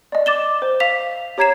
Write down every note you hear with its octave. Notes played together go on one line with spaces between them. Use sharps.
D5 D#5
D6 A6 E7 G7
C5
F5 B6 F7
G4 C#5 A#5 G#6 C7 E7